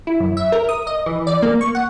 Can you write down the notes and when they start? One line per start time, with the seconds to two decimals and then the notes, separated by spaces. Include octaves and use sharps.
0.07 E4
0.20 F#2
0.37 E5
0.52 A#4
0.69 D#6
0.87 D#5
1.06 E3
1.27 D5
1.42 A#3
1.61 C#6
1.75 F#5